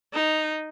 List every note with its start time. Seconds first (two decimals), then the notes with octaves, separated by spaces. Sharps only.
0.13 D#4